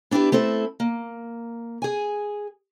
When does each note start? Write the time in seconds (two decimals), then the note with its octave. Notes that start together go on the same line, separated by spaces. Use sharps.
0.11 B3 D4 E4 G4 B4
0.32 A3 C4 E4 A4
0.80 A#3
1.82 G#4 G#5